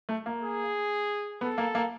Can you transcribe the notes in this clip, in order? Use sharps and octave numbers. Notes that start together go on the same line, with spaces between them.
A3
A#3
G#4
B3 A4
A#3
A#3